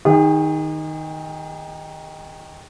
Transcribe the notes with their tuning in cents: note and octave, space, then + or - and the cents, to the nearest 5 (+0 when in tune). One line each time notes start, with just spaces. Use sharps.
D#3 +5 G#4 -40